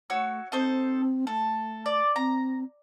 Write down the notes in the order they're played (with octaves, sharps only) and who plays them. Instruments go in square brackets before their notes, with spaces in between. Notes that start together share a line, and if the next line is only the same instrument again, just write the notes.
[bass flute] A3 [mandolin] F#4 C#5 E6
[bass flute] C4 [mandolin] D#4 A4 C5
[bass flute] A3 [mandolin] A4
[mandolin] D5
[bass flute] C4 [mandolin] A#5